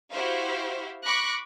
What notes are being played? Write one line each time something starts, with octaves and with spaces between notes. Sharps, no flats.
E4 F#4 G4 C5 E5 F5
B5 C#6 D6 F#6 A#6